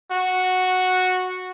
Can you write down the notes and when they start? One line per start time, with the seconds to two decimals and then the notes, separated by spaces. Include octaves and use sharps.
0.11 F#4